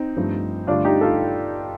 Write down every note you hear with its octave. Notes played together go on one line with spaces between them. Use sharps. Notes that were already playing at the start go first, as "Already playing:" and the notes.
Already playing: C4 D#4
G2 F3 A3
G2 D3 A3 D4 F4
D#4 G4
F4 A4